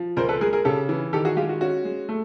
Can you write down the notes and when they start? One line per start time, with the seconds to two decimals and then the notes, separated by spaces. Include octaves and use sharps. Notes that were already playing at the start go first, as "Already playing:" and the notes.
Already playing: F3
0.17 C#2 A#4 C5
0.29 A4 B4
0.41 G#3 G#4 A#4
0.53 G#4 A#4
0.65 C#3 G4 A4
0.89 E3
1.13 D#3 G4 A4
1.25 F#4 G#4
1.37 G#3 F4 G4
1.49 F#4
1.61 C#4 F#4
1.85 G#3
2.09 A3